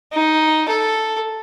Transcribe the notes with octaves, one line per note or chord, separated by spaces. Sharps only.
D#4
A4